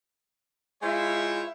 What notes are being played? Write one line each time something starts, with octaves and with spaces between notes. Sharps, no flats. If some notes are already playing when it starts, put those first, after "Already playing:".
G#3 E4 F4 C5 C#5 E5